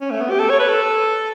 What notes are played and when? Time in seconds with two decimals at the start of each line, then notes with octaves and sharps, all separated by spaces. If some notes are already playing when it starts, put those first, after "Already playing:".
0.01 C#4
0.11 A3
0.21 B3
0.30 G4
0.40 A4
0.50 C#5
0.59 B4
0.69 A4